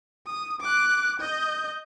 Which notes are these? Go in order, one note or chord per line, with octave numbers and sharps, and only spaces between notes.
D#6
D6 F#6
D#5 G6